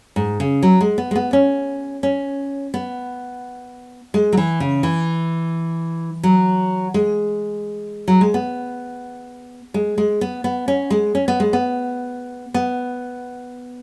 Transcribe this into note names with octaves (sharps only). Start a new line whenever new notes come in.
G#2
C#3
F#3
G#3
B3
G#3
B3
C#4
C#4
B3
G#3
F#3
E3
C#3
E3
F#3
G#3
F#3
G#3
B3
G#3
G#3
B3
B3
C#4
G#3
C#4
B3
G#3
B3
B3